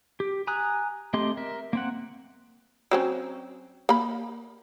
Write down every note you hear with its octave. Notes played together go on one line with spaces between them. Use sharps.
G4
G#5 A#5 D#6 F#6
A3 C4 G4 D#5 C6
A#4 E5
A#3 C4 F#5
F#3 C4 C#4
A#3 B5